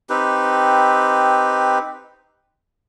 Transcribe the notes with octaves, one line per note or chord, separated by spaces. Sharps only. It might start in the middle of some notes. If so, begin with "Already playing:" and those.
C4 D#4 G4 B4